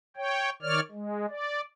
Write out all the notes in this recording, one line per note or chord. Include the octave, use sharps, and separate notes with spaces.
C#5 G5
D#3 C#5 D5 F6
G#3
D5